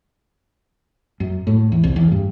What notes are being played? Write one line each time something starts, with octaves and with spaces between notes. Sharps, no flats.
F#2
A2
E2
C2
E2
G2